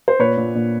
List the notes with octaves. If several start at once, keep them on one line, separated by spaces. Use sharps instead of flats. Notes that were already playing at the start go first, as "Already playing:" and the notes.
C5
A#2 B4 C#5
A#2
A#2